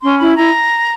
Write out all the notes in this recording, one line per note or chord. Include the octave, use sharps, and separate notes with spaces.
C#4 C6
E4 B5
E4 A#5